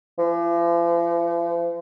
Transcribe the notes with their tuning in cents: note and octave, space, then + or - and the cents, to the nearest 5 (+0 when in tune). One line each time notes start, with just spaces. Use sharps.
F3 -45